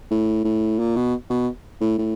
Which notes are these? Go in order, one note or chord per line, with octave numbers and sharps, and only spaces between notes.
A2
A2
A#2
B2
B2
A2
A2